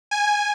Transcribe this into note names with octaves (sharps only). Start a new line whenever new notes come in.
G#5